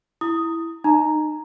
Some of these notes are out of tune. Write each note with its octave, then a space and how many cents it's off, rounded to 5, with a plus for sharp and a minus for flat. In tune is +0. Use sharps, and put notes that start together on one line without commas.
E4 +0 D#6 +0
D#4 -25 A#5 +0